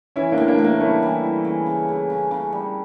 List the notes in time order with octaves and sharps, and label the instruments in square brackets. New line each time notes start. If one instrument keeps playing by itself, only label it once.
[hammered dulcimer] E3 [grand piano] C#4 E4
[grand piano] A#3 D4
[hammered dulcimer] A2
[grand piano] A#3 D4
[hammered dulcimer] A2
[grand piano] A#3 D4
[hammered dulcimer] G3 [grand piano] A3 C#4
[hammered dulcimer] E3
G3
C#3
C#3
C#3
C#3
C#3
G3